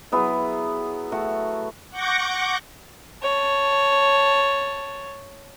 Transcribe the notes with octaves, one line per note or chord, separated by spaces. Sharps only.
F#3 B3 E4 G#4
A3 F#4
F#5 C#6 D6 G6 A#6 C#7
C#5 A5